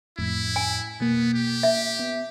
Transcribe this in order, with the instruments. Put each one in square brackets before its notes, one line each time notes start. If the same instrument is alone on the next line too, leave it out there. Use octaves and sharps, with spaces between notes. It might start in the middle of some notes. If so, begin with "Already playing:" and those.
[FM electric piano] F2 A2 [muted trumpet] E4
[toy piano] G#5
[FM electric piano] B2 A#3 [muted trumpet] B3
[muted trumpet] G4
[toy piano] E5
[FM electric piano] B3